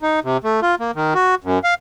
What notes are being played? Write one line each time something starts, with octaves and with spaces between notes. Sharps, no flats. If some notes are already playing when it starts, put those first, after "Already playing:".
D#4
C3
A3
F4
A#3
D#3
F#4
F#2
F5